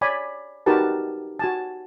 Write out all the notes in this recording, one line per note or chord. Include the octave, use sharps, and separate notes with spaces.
C#5 D5 G#5 B5
D#4 F#4 G4 A#4 B4 A5
F#4 G#5 A5